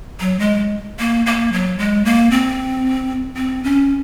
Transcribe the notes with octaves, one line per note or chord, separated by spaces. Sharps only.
F#3
G#3
A#3
A#3
F#3
G#3
A#3
C4
C4
C#4